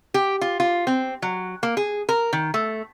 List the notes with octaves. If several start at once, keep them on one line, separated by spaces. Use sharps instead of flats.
G4
F4
F4
C4
F#3
A#3
G#4
A#4
D#3
A3